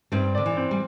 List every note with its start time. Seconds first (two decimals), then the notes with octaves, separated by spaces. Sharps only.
0.12 G2 G3 C4
0.35 D3 D5
0.46 E3
0.57 C4
0.71 G3